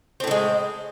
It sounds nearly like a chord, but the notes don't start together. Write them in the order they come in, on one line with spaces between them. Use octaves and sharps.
C4 A2 D3 G#3